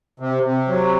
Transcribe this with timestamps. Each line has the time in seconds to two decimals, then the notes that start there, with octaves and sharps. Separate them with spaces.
0.20 C3
0.43 C3
0.67 F#3